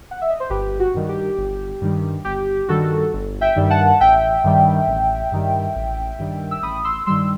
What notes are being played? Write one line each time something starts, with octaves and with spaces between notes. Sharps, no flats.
F#5
E5
D#5
C5
G1 G4 B4
F#4
G2 D#3 G3
G4
G1
G2 D#3 G3
G1 G4
G2 D#3 G3 F#4 A4
G1
E5 G5
G2 D#3 G3
F#5 A5
A1 E5 G5
G2 D#3 G3
A1
G2 D#3 G3
A1
G2 D#3 G3
E6
A1 B5 D#6
C6 E6
G2 D#3 G3 C6 E6